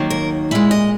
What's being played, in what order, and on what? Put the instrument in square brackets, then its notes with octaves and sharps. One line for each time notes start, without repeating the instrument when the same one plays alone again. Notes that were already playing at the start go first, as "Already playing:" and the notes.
Already playing: [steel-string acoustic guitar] D#2 D#3 F#3 A#3
A#4
A#2 G#3 E4
D#5